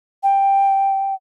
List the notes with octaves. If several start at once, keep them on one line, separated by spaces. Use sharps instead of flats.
G5